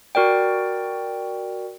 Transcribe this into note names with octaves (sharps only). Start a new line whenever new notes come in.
F#4 A#4 D5 G5